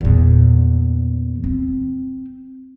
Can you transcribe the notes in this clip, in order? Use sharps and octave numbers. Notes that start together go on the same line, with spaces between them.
E2 A#2
C4